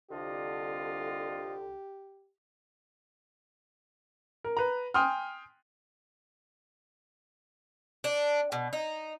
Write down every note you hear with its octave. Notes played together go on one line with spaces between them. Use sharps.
C2 D3 F4 G4 D#5
A#4
B4 A#5
G5 G#5 C6 D#6 F6
D4
B2
D#4